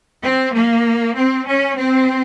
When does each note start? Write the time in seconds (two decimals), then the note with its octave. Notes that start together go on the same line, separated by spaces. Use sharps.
0.22 C4
0.53 A#3
1.15 C4
1.45 C#4
1.75 C4